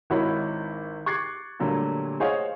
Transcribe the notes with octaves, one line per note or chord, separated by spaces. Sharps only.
G#1 D#3 E4 F#4 C#5 B5
C#6 D6 F#6 G#6 A6 C7
A#2 D3 F#3 G3 A3 A#3
G#4 C5 C#5 D#5 F5 F#5